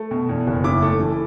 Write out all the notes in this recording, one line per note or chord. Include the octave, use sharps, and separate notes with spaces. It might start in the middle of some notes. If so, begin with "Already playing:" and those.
Already playing: A3
B2
E2
F#1
E4 D6
A3
E3